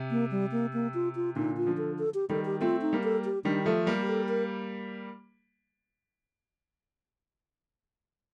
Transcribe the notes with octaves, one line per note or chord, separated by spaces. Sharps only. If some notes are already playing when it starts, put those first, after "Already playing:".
Already playing: C3
A#3
G3
A#3
A#3
F4
F4
A#2 D3 D#4
F4
D3 F3
A4
A4
G4
D#3 G3 A4
G4
A3 C4 F4
D#4
G3 A#3
A4
G4
D#3 G3 D4
F3 A3 A4
G3 A#3 G4
A4
A#4